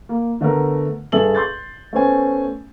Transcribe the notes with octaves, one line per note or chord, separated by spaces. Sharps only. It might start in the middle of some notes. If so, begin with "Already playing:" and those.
A#3
D3 A3 B3 A#4
G2 G#4 A4 E5 F#7
C6 G6 A6
A3 B3 C#4 C5 G#5